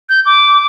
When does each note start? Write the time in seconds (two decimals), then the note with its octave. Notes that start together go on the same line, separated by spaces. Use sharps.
0.09 G6
0.26 D6